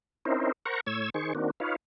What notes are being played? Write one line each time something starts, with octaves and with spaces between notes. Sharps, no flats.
C4 C#4 D#4 E4 A#4 C5
A#4 C5 F#5 A#5 C#6
A2 C#5 E6 G#6
D#3 G#4 C5 C#6
D#3 A#3 C4 D4 F#4
D#4 F4 B4 C#5 F5